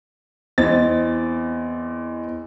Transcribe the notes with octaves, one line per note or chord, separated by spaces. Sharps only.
E2 C4 D#5 A6